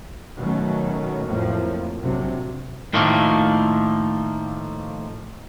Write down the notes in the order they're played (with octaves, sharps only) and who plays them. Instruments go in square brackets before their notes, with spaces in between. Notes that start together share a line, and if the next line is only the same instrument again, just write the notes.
[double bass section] B2 D#3 F#3 A3 C#4
F2 A2 F3 F#3 A#3
A#1 C3 F#3
[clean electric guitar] A2 D#3 F3 A3 A#3